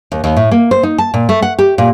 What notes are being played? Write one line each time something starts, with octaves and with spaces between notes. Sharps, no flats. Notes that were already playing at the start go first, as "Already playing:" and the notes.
D#2
D#2
A2
A#3
C5
D#4
A5
A#2
A3
F#5
G4
A#2